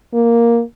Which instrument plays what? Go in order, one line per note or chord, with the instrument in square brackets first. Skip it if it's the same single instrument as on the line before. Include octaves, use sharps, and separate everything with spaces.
[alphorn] A#3